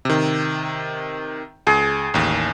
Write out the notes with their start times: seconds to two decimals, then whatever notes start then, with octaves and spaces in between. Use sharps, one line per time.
0.05 C3 D#3
1.67 C#2 G#4
2.14 A1 D#2